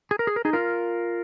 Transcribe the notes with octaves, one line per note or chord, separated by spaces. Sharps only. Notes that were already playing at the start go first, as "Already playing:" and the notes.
G#4
A#4
G#4
A#4
D#4 G#4
F4 A#4